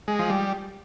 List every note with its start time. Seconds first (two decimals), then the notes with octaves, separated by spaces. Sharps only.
0.08 G#3
0.19 F3
0.30 G3